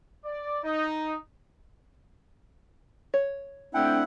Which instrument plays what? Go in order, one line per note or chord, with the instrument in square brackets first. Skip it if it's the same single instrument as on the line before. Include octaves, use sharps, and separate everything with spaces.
[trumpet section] D5
D#4
[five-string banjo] C#5
[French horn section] A3 C4 D4 [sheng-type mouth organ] E4 F#5 [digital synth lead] G5